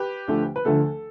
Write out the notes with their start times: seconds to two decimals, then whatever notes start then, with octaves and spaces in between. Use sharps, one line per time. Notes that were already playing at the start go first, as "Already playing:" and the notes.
Already playing: G4 B4
0.28 D2 D3 F3 A3
0.56 B4
0.65 D2 D3 F3 A3 A4